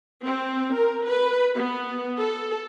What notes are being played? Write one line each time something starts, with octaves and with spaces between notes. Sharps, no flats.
C4
A#4
B4
B3
A4